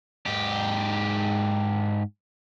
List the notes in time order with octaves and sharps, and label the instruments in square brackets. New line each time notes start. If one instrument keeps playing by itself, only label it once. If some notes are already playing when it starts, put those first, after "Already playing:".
[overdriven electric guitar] G#2 G4